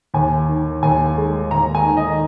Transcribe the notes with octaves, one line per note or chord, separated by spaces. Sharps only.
D#2 G#5
D#3
D#2 G#5
G#3
D#2 A#5
G#5
D#3
D#5